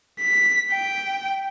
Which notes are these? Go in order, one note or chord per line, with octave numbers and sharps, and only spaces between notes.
B6
G5